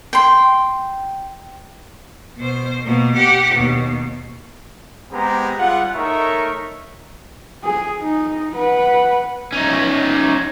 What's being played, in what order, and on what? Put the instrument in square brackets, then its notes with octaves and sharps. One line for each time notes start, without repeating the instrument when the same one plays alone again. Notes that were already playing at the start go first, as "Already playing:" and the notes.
[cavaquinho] G5 C6
[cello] B2 C5
B2 A#3
G4 F#5
D#2 B2
[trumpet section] G#3 B3 C4 G4 A#5
G3 F4 G#4 F#5
A3 D#4 A#4 C#5 E5 C#6
[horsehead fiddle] G#4
D#4
B4 F#5
[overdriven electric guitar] C#4 D#4